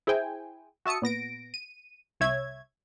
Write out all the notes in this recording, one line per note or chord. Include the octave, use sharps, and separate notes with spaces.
E4 G#4 C5 G5 G#5
F#4 E5 A5 D#6 C#7
A#2 B3 A#6 D7
D#7
C2 C#5 E5 G#6